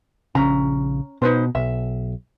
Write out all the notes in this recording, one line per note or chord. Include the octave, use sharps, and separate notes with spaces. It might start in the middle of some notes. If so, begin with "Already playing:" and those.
A#1 C#3 C#4 A#5
B2 D#4 B4 C5
B1 E5